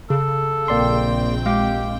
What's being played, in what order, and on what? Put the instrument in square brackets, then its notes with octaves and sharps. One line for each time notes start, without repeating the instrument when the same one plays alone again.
[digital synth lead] C#3 [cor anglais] A4
[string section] A#1 C4 G5 [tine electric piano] A#3 D5 C6
[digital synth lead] G#3 [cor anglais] G4 [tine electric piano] F5 D6